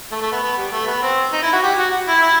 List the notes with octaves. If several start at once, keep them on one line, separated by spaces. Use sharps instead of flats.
A3
A3
B3
B3
G3
A3
B3
C4
D#4
E4
F#4
G4
F#4
E4
E4